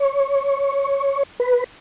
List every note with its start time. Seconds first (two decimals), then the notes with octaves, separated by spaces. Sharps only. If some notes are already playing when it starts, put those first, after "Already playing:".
Already playing: C#5
1.40 B4